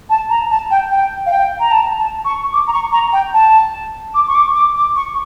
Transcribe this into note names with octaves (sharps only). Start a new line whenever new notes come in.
A5
A#5
A5
G5
G5
F5
G5
A#5
A5
A5
C#6
D6
A#5
C#6
A#5
G5
A5
D6
C#6
D6
D6
D6
C#6